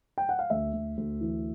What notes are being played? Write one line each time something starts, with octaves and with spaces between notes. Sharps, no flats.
G5
F#5
F5
D2 E5
D2
D2
E3